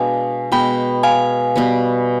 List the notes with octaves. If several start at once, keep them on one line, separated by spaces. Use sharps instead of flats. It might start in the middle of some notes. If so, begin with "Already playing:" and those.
Already playing: B2 G#3 D4 F5 G#5
B2 G#3 B3 G5 B5
F5 G#5
B2 G3 B3